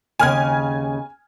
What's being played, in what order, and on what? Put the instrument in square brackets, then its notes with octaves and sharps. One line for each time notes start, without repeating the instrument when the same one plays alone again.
[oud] D#2 C#3 [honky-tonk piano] G#5 F6 G#6